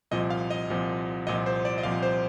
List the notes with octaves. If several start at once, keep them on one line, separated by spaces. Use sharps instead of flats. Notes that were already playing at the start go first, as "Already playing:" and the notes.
C2 A#2 F3 D#5
F5
D#5
C2 A#2 F3
C2 A#2 F3 D#5
C5
D5
D#5
C2 A#2 F3 F5
C5